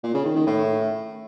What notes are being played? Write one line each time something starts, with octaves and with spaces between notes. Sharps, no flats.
A#2
C#3
D#3
D#3
A2